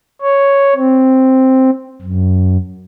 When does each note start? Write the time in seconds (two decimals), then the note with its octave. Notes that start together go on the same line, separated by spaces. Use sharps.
0.21 C#5
0.75 C4
2.01 F#2